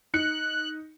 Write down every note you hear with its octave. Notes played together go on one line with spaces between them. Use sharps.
D#4 F#6 C#7